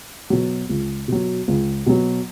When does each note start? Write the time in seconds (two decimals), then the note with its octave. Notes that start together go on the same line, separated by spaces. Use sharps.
0.30 B2 F#3
0.69 C#2
1.08 B2 F#3
1.48 C#2
1.86 B2 F#3